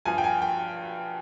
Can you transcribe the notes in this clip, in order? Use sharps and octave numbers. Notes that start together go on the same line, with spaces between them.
G2 F3 G#5
G5
G#5
G5